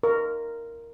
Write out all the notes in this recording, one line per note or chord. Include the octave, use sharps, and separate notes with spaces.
A#4